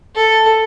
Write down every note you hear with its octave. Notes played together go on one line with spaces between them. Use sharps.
A4